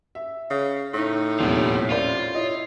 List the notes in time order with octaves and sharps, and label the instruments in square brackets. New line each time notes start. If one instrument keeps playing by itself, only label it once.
[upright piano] E5
[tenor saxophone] C#3
[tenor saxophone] A2 [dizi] D#4
[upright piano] D#1 E2 C3 [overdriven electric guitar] F3 G3
[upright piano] C#4 C5 D5 [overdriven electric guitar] F4
[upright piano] E4 D#5 [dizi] C#5